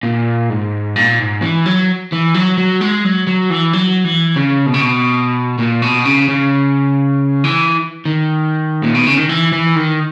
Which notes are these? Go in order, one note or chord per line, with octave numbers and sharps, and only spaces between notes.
A#2
G#2
A#2
G#2
E3
F#3
E3
F#3
F#3
G#3
F#3
F#3
E3
F#3
E3
C#3
B2
C#3
B2
A#2
B2
C#3
C#3
E3
D#3
A#2
B2
C#3
D#3
E3
E3
D#3